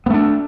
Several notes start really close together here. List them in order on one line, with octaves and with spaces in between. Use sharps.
B3 A3 D4